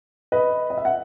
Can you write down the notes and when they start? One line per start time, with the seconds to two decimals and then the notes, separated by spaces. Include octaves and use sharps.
0.32 B4 D#5
0.70 D#5
0.78 E5
0.85 F#5